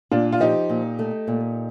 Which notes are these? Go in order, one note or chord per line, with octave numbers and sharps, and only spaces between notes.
A#2 D4 F4
F4
F3 D#4 G4
A#2
A3
A#2